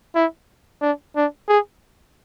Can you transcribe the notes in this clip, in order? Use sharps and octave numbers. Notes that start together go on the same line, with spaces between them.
E4
D4
D4
G#4